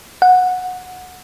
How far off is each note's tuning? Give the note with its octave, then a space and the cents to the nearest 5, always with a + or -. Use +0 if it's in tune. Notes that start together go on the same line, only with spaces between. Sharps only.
F#5 -15